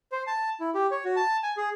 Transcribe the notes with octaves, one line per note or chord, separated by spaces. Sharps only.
C5
A5
E4
G4
C#5
F#4
A5
G#5
G#4